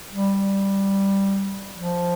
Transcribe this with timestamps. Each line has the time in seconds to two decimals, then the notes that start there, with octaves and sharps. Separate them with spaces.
0.12 G3
1.75 F3